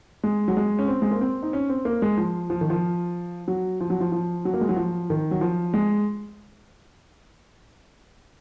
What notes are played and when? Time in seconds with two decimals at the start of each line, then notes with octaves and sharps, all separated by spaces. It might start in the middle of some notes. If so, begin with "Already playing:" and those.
0.23 G#3
0.48 F#3
0.57 G#3
0.79 C#4
0.88 C4
1.02 G#3
1.11 A#3
1.21 C4
1.43 D#4
1.53 C#4
1.69 C4
1.85 A#3
2.02 G#3
2.17 F3
2.50 F3
2.61 D#3
2.70 F3
3.48 F#3
3.81 F3
3.90 F#3
4.00 F3
4.12 F3
4.45 F#3
4.54 A#3
4.61 G#3
4.69 F#3
4.76 F3
5.10 D#3
5.31 F#3
5.41 F3
5.74 G#3